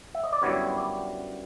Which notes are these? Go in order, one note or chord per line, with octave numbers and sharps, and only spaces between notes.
E5
D#5
D5
F#2 D3 G3 B3 E4 C#5
D5